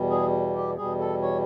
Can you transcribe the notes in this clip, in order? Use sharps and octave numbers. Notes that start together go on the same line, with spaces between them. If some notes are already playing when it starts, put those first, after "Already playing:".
Already playing: E2 B2 G3
G#4
G4
E2 B2 G3 G#4
A4
C#5